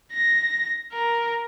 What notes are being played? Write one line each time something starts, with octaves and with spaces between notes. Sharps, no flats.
A#6
A#4